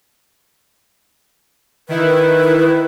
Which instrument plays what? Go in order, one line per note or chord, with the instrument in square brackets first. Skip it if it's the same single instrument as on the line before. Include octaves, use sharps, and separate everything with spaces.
[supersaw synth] D#3 E4 [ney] B4